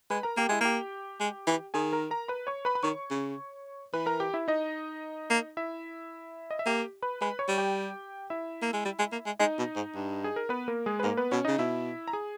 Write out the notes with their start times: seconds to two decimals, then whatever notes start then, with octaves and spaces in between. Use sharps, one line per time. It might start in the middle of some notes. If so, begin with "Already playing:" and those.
0.10 G#3 B4 B5
0.23 A#4 A#5
0.37 A#3 G4 G5
0.49 G#3 E4 E5
0.61 A#3 G4 G5
1.20 G#3
1.47 E3
1.74 D#3 G#4 G#5
1.93 A#4 A#5
2.11 A#4 A#5
2.28 B4 B5
2.47 C#5 C#6
2.65 B4 B5
2.75 B5
2.83 D#3 C#5 C#6
3.11 C#3
3.94 E3 B4 B5
4.06 A#4 A#5
4.20 G4 G5
4.34 E4 E5
4.48 D#4 D#5
5.30 A#3
5.57 E4 E5
6.51 D#5
6.59 E5
6.66 A#3 G4 G5
7.02 B4 B5
7.21 G#3 B4 B5
7.39 C#5 C#6
7.48 G3
7.58 G4 G5
8.30 E4 E5
8.62 A#3
8.73 G#3
8.85 G3
8.99 G#3
9.12 A#3
9.26 G#3
9.39 G#3 D#4 D#5
9.58 B2
9.76 G#2
9.95 G2
10.24 G#4
10.36 A#4
10.49 B3 B4
10.68 A#3 A#4
10.86 G#3 G#4
10.99 B4
11.04 G#2 A#3 A#4
11.17 B3 B4
11.32 B2 C#4 C#5
11.45 C#3 D#4 D#5
11.58 B2 E4 E5
12.08 A#5
12.13 G#4 G#5